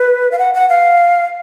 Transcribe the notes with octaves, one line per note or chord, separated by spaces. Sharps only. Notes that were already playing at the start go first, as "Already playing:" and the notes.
Already playing: B4
F5
F#5
F#5
F5